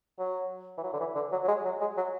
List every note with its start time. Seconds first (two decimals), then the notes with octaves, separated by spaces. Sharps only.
0.19 F#3
0.77 E3
0.83 F#3
0.93 D3
0.99 E3
1.15 D3
1.32 F#3
1.43 F#3
1.48 G#3
1.65 F#3
1.81 G#3
1.97 F#3